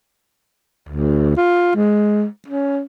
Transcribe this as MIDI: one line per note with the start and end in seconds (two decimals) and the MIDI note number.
0.89 1.37 38
1.37 1.72 65
1.76 2.25 56
2.48 2.81 61